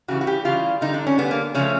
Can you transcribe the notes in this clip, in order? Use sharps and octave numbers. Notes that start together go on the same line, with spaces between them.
C#3 E3 G3 F#4
F#4
G4
C#3 E3 G3 F4
D3 G3 D#4
D4
C#4
D3 G3 B3
A#3
C#3 F3 A3 C#4